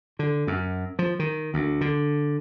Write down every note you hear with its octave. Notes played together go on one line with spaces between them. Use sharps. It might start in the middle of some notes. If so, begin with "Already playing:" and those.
D3
F#2
F3
D#3
D2
D3